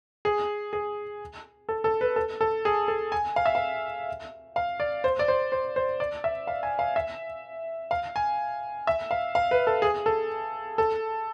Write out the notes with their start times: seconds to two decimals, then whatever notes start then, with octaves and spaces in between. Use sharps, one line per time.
0.25 G#4
0.73 G#4
1.69 A4
1.84 A4
2.01 B4
2.16 A4
2.41 A4
2.65 G#4
2.88 A4
3.12 G#5
3.36 F5
3.46 E5
3.55 F5
4.56 F5
4.80 D5
5.04 C5
5.19 D5
5.28 C5
5.52 C5
5.76 C5
6.00 D5
6.24 E5
6.47 F5
6.63 G#5
6.79 F5
6.96 E5
7.91 F5
8.16 G#5
8.87 E5
9.11 F5
9.35 F5
9.51 B4
9.67 A4
9.82 G#4
10.06 A4
10.78 A4